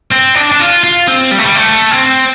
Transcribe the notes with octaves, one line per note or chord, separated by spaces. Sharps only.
C4
D4
D4
F4
F4
C4
G3
A3
G3
A3
C4